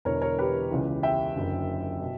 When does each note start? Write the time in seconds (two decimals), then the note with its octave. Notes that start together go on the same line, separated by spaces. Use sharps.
0.05 E1 E2 D3 A#4 C#5
0.21 A#4 C#5
0.39 G4 B4
0.71 C#2 C#3 E3
1.03 E5 G5
1.35 F#1 F#2 D3
2.00 B2